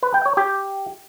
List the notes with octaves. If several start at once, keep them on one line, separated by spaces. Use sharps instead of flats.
B4
G5
C#5
G4